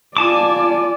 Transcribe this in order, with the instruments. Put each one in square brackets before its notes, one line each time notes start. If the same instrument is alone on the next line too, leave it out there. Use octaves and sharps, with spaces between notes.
[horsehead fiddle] F4 D5 [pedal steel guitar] G#5 A5 D6